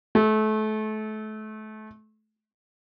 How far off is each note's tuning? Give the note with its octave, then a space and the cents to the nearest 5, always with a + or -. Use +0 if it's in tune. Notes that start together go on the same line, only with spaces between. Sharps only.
A3 -30